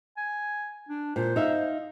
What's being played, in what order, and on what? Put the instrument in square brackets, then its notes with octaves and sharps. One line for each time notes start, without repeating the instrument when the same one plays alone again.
[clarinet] G#5
D4
[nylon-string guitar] A#2 [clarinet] C5
[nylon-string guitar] D#4 E5 F5